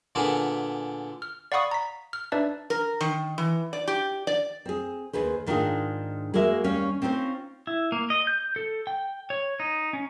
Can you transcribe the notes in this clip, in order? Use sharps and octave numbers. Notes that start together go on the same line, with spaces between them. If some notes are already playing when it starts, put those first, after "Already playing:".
A#2 D3 B3 D4 G#4 A#4
F6
D5 F5 F#5 B5 C#6 D#6
A#5 B6
F6
D4 D#4 B4 D5 E5 A5
A#4
D#3
E3
D5
G4
D5
C4 G#4
D#2 G#4 B4 C5
G#2 D#3 D4 E4 F4 G#4
G#3 A#3 F#4 A#4 E5
D#2 G3 C#4 C#5 F5
C4 C#4 D#4 F4 C5
E4
A#3
D#5
G6
A4
G5
C#5
D#4
C#4